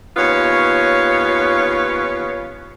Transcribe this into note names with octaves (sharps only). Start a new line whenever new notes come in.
D#2 B3 C#4 F4 C#5